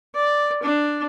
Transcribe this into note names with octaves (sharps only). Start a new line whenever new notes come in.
D5
D4